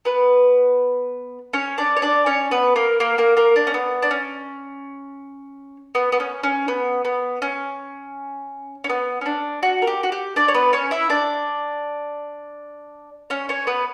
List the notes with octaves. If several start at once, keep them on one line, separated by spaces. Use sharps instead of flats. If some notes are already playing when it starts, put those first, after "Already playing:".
B3 B4
C#4 C#5
D4 D5
C#5
D4 D5
C#4 C#5
B3 B4
A#3 A#4
A#3 A#4
A#3 A#4
A#3 A#4
D4
C#4
B3
D4
C#4
B3
B3
C#4
C#4
B3
B3
C#4
C#4
B3
C#4
D4
F#4
A#4
G4
F#4
G4
D4 D5
C#5
B3 B4
C#4 C#5
E4 E5
D4 D5
C#4 C#5
C#4 C#5
B3 B4